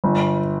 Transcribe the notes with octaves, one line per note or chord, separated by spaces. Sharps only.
G1